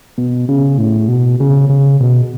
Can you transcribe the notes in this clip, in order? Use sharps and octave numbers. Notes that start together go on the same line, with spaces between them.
B2
C#3
A2
B2
C#3
C#3
B2